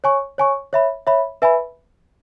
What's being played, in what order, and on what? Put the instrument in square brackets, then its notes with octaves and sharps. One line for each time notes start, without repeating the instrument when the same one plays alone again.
[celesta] C#5 G#5 C#6
C#5 G#5 C#6
C#5 E5 B5
C#5 E5 B5
B4 E5 G#5 B5